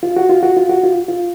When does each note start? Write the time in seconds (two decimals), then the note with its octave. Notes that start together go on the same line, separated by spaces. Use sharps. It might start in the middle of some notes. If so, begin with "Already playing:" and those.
0.03 F4
0.17 F#4
0.29 F4
0.43 F#4
0.57 F4
0.69 F#4
0.84 F4
1.08 F4